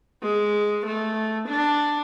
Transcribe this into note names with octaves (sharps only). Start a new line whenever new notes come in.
G#3
A3
D4